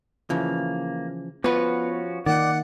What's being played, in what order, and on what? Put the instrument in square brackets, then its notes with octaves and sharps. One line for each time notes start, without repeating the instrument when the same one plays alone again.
[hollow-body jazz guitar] C#3 E3 F3 [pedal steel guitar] A#3
[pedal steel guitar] F3 C#4 F#4 [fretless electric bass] B3 [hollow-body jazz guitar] F4 B4
[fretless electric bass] D#3 A#3 [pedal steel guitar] D5 [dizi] F#5